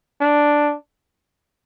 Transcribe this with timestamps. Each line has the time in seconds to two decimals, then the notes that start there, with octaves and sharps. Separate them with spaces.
0.21 D4